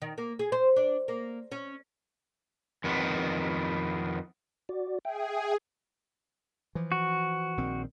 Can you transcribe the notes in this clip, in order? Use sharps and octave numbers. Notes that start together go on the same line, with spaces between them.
D#3
A#3
G#4
C5
D4
A#3
C#4
F2 D#3 B3
F#4 D5
G#4 E5 G5
E3 F3
F#4
A#1 D#3 C4